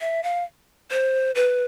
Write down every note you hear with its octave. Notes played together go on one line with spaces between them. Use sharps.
E5
F5
C5
B4